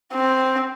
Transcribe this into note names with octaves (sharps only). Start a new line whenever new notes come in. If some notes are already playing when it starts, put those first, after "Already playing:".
C4